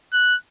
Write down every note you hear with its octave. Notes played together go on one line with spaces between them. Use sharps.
F#6